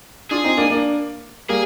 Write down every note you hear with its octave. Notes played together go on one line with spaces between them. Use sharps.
D4 F4 G#4
C4 D#4
A#3 D4
A#3 D4
G3 A#3 G#4